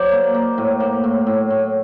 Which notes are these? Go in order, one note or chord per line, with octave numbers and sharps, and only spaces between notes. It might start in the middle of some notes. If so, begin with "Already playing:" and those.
Already playing: F#3 C5 D5
A#3
A#3
A2
A#3
A2
A2
A2